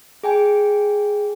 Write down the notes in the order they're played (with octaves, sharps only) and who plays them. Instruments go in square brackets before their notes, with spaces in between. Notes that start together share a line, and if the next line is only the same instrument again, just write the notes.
[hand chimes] G#4 G5 G#5